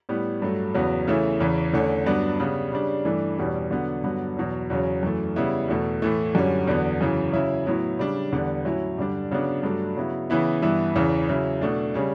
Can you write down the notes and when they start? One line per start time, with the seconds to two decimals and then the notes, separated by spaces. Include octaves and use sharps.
0.09 A2 G3 B3
0.42 G2 F#3 A3
0.75 E2 C#3 F#3 B3
1.07 C#3 E3 A3 C#4 E4
1.40 E2 C#3 E3
1.73 E2 D3 A3 C#4
2.06 G2 F#3 B3 D4
2.39 C#3 G3 B3
2.72 C#3 G3 D4
3.05 G2 E3 A3 D4
3.38 E2 B2 G3 C#4
3.71 D3 F#3 B3 D4
4.04 G2 D3 F#3 B3
4.37 E2 B2 F#3
4.70 E2 C#3 F#3 C#4
5.03 F#2 E3 A3
5.36 C#3 G3 B3 E4
5.68 E2 B2 A3
6.02 A2 E3 A3
6.35 F#2 D3 G3 C#4
6.67 E2 D3 F#3 B3
7.01 F#2 C#3 E3
7.33 C#3 F#3 C#4 E4
7.66 A2 F#3 B3 E4
7.99 C#3 G3 D4
8.32 E2 D3 G3 B3
8.65 A2 F#3 C#4 E4
8.98 G2 D3 G3 D4
9.31 C#3 F#3 B3 D4
9.63 G2 F#3 A3 D4
9.97 C#3 F#3 B3 E4
10.30 C#3 E3 B3 E4
10.62 G2 E3 B3 E4
10.95 E2 C#3 E3
11.29 C#3 F#3 C#4 E4
11.61 B2 A3 D4
11.94 C#3 G3 C#4